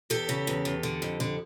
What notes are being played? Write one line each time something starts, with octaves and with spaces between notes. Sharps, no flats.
E2 G4 A4
C#3
E2
E2
D3
F2
D3